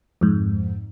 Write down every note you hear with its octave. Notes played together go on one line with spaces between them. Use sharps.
F2 G#2